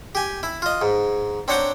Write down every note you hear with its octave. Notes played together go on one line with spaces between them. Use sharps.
G4 G#5
E4
F4 D#5
G#2
C4 D4 C#5 F#5 G5 A#5